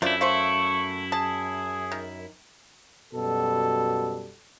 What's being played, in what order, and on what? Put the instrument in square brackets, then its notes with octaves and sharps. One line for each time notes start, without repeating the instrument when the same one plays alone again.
[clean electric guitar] F#2 E4 [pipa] F3 A3 D4
[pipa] A3 C5 F5 [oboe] C#6
[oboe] G#4 [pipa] A5
[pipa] D#3
[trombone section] F#2 B2 G3 A4